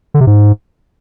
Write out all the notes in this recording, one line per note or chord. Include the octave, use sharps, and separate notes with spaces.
D3
C3
G#2